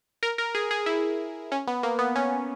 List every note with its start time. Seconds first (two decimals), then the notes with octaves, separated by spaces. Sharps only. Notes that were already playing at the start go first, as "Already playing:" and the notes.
0.23 A#4
0.38 A#4
0.55 G#4
0.71 G#4
0.86 E4
1.52 C#4
1.67 B3
1.83 A#3
1.99 B3
2.16 C#4